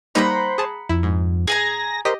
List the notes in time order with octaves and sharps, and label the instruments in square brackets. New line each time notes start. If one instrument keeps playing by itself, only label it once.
[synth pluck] G3 A#3 D#4 [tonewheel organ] C5 [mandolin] F#5 A#5 B5
[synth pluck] G#4 A5
[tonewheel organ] F2 [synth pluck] E4
[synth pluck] G#2
[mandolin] G#4 G#5 A#5 [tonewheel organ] A#6
[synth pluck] G4 D#5 B6 [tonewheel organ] A#4 C5